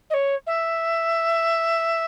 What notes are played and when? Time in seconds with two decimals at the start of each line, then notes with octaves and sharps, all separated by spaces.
0.10 D#5
0.14 C#5
0.47 E5